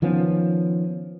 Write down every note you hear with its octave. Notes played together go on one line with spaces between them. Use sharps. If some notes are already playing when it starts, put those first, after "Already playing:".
D#3 F3 B3 C#4